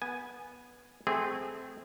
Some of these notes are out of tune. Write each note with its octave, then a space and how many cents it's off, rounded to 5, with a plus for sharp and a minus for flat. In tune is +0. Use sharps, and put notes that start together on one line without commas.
B3 -10 G#5 +0
A3 -20 C4 -15 G#4 -25